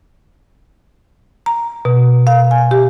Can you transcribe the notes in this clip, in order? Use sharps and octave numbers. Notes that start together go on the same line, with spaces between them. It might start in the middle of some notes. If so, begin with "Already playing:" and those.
A#5
B2
F5
G#5
G4